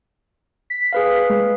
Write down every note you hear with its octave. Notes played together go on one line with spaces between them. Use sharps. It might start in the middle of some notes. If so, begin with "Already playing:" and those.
B6
G#4 B4 F5
G#3